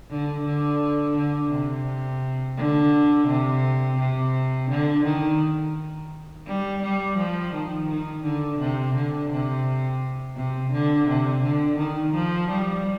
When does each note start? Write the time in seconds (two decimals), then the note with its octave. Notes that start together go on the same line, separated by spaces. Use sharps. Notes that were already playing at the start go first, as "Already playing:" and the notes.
0.10 D3
0.46 D3
1.16 D3
1.51 C3
2.58 D3
3.28 C3
3.99 C3
4.70 D3
5.05 D#3
6.47 G3
6.83 G3
7.18 F3
7.53 D#3
7.89 D#3
8.24 D3
8.60 C3
8.95 D3
9.31 C3
10.36 C3
10.73 D3
11.08 C3
11.43 D3
11.78 D#3
12.14 F3
12.50 G3